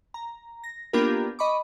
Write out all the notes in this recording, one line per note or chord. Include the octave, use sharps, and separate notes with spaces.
A#5
A#6
A#3 B3 D4 F4 G4 A#4
D#5 B5 C#6 D6